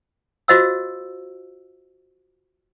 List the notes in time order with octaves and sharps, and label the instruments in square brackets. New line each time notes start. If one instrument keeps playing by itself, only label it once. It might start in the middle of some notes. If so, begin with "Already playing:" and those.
[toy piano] F4 F#4 C5 D#5 F5 E6